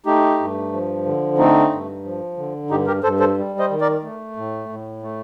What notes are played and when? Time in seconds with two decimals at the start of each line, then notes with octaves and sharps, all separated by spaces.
0.06 A3 D#4 G4
0.40 G2
0.73 F3
1.06 D3
1.38 A3 C4 D#4
1.72 G2
2.05 F3
2.37 D3
2.70 G2 D#4 G4
2.87 G4 A#4
3.03 G2 A4 C5
3.20 A4 C5
3.37 G3
3.59 C5 D#5
3.70 D#3
3.81 A#4 D5
4.03 A3
4.37 A2
4.69 A2
5.03 A3